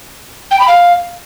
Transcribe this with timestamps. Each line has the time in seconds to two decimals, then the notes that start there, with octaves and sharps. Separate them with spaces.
0.51 G5
0.60 B5
0.68 F5